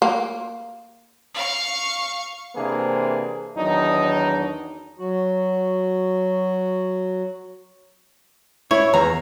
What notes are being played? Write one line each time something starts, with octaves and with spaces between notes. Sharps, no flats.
A#3
F5 C#6
C3 E3 A#3 D4 G#4 C5
E2 D#3 F#3 D4 D#4
F#3 F#4
E4 C#5
E2 A#5